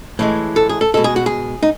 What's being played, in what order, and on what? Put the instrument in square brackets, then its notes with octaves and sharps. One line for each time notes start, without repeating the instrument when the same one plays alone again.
[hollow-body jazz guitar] A2 E3 G#3
A4
G#4
A4
B2 G#3 A4
G#4
F#4
G#4
D#4